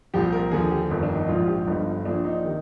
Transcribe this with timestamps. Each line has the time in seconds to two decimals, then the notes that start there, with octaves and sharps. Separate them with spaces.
0.14 C2 A#2 F3 G4
0.32 A#4
0.51 D#2 D3 F3 G#4
0.71 G4
0.90 G1 F2 D#3
1.03 D4
1.15 D#4
1.28 A#1 G#2 F3 F4
1.47 G4
1.66 G1 G2 D3 F3 D#4
2.05 A#1 A#2 F3 D4
2.24 D#4
2.44 C3 D#3